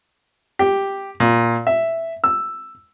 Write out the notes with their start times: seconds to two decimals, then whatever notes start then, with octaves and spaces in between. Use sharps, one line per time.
0.59 G4
1.20 A#2
1.67 E5
2.24 E6